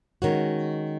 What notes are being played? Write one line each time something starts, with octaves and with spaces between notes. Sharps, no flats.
D#3 G#3 C#4 F#4